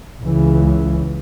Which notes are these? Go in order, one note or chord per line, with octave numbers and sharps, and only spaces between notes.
C#2 C#3 E3